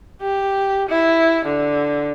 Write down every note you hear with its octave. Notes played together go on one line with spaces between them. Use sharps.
G4
E4
D3